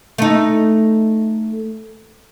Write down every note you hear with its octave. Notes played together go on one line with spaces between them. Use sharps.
A3 D#4